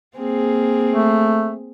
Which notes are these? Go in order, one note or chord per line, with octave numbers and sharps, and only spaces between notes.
A#3 C4 G#4
A3